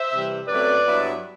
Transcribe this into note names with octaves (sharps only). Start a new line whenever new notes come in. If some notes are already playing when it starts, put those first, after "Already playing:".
Already playing: C5 E5
C3 E3 G3
F#2 F#3 A3 C4 B4 D5
G2 F#3 B3 E4